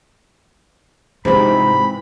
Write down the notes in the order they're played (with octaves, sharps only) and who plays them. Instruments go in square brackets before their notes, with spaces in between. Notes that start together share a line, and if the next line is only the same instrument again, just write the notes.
[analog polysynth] G#2 C3 [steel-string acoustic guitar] E3 C4 [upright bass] G#3 F4 [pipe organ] B5